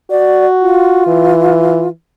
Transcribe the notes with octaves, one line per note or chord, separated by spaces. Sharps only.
F#4 D5
F4
E3